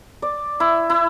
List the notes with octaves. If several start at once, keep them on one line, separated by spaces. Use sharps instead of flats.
D5
E4
E4